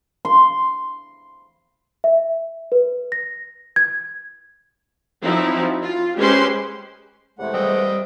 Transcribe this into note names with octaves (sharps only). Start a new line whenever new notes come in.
C6
E5
B4
A#6
G#6
F3 F#3 C4 D#4 E4
F4
G#3 C#4 G4 B4 C5 C6
E2 C3 G#3 A3 F#5
G3 C4 D#5 G5